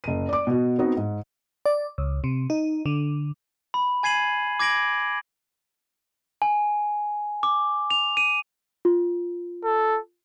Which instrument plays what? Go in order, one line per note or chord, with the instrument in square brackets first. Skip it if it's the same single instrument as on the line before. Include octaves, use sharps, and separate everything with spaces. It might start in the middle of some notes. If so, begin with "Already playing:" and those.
[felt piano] F#1 D#7
D5 D6
B2 F#4
B3 C4 D#4 F#4
G#2
[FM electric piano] D5
C#2
C3
D#4
D3
[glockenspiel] B5
G#5 G#6 C7 D#7 F#7
D6 G#6 A#6 D7 F#7
G#5
D6
F7
D#7
[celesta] F4
[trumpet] A4